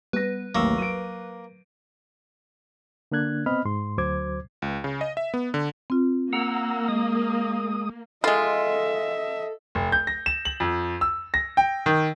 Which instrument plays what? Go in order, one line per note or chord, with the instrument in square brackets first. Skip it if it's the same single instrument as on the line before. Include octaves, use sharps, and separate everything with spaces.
[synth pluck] G3 [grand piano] B3 A#6 [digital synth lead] B4
[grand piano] A1 D#2 [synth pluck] F#3 C#6 E6 [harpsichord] A#3
[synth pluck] F#3 [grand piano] D7 D#7
[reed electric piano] D3 A#3 D4 F#6 G#6
B3 C4 D#5 B5 F6
G#2 C6
D2 F#3 C5 D6 G#6
[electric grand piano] C#2
C#3
D#5
E5
B3
D3
[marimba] C4 F4
[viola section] A#3 [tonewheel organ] F#5 A#5 E6
[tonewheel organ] G#3 D#6
[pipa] G#3 F4 [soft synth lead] A4 [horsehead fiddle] D#5 E5
[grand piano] F1
G6
A#6
E7
F#7
F2
E6
A#6
G5
D#3